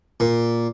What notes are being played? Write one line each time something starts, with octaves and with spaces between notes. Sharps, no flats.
A#2